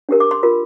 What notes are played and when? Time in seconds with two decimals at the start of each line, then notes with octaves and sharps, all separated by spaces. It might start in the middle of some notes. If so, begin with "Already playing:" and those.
0.09 D4 G4 A#4
0.20 D6
0.31 C6
0.43 F4 A#4